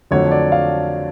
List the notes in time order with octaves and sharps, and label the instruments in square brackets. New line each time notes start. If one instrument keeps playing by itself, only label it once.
[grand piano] F2 D3 F#3 A3 C#5
D5
F5